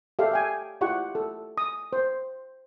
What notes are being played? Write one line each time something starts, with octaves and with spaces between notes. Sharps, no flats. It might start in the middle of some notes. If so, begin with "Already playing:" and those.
G4 A4 E5 F5
F5 G5 G#5
E4 F4 G4 F#5 C#6
A4
D#6
C5